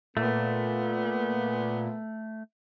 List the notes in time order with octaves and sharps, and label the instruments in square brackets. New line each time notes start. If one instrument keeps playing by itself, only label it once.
[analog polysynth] A#2 [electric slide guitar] A3 [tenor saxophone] B3